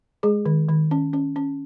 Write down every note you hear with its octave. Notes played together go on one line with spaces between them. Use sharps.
G#3 G#4
D#3
D#3
C#4
C#4
C#4